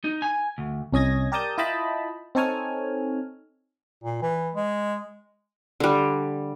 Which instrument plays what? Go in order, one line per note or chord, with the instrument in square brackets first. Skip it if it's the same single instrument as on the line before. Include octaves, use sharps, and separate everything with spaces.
[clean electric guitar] D#4
G#5
D2
[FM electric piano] C2 C#4 D#5 G#6 A#6
G4 A#4 D5 A5 D#6 G6
E4 F4 D#5 G5 A5 B5
C4 D#4 A4 C#5 G#5 F6
[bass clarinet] A#2
E3
G#3
[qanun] D3 G3